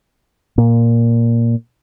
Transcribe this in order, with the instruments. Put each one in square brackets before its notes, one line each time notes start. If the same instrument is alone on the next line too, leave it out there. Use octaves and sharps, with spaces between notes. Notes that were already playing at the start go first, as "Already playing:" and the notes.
[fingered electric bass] A#2